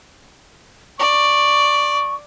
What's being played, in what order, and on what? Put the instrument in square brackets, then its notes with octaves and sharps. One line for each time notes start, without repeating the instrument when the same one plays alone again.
[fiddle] D5 [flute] C#6